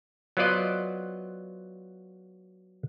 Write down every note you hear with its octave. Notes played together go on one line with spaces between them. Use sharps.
F#3 B3 F4 C5 D5 D#5